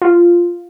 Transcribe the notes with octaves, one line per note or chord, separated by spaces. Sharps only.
F4